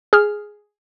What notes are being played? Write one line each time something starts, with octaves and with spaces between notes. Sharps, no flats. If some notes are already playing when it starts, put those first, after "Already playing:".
G#4 F6